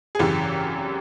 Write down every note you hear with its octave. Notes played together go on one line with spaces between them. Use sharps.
G#4
G#1 F#2 C#3 E3 G4